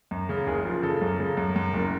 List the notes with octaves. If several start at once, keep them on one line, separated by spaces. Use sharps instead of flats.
F#2
C#3
F#1 G#4
F3
C#3 A4
F#2
C#3
F#2
F#2
F#1